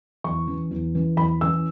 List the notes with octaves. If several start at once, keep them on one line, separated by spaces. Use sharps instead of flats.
E2 C#6
E3 C#4
E2
E3 C#4
E2 B5
E3 C#4 E6